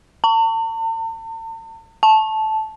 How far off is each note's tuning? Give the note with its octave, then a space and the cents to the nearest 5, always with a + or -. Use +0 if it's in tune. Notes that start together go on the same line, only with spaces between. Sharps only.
A5 +45
A5 -10